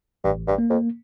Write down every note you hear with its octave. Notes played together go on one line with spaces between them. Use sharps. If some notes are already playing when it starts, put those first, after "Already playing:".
A1 G2
G2
A#3
F2